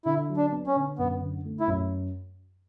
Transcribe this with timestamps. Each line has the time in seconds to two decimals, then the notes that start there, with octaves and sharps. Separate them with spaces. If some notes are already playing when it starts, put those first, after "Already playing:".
0.05 D3 E4
0.29 F#3
0.37 D4
0.52 B3
0.67 C#4
0.76 D3
0.98 F#2 B3
1.22 D3
1.45 A3
1.60 E4
1.67 F#2